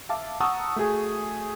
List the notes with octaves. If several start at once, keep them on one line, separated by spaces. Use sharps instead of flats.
E5 F5 A5 D6
F#5 A5 A#5 C#6 D#6 E6
A3 F#4 G#4 G#5